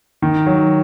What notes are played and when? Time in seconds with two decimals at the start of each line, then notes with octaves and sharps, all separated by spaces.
0.22 D#3
0.46 F#3